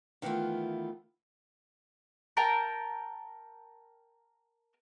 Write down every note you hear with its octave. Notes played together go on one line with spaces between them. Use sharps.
D#3 E3 A3 B3 F4
A#4 G5 A5 A#5